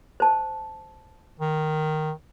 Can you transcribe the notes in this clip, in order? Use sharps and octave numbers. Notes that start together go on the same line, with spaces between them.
C5 A5
D#3